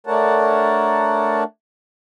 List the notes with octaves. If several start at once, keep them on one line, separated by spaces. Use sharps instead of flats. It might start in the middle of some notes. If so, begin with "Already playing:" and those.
A3 D4 A#4 C#5 F#5 A5